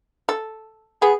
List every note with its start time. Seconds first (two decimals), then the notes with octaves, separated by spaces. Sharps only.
0.29 A4
1.02 B3 G#4